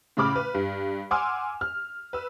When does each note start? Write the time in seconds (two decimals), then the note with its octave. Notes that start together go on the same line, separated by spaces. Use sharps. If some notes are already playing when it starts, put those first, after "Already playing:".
0.17 A2 C#3 B5 D6 F6
0.36 B4
0.54 G2
1.11 F#5 G#5 C6 D6 E6 F6
1.61 F6
2.13 B4 E6